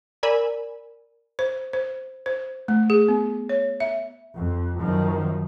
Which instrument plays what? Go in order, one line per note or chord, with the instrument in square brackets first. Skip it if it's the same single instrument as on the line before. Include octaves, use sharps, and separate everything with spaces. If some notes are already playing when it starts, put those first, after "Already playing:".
[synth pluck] A#4 D5 G#5 B5 E6
[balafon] C5
C5
C5
A3
G#4
B3
C#5
E5
[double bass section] F2
F#2 D#3 F3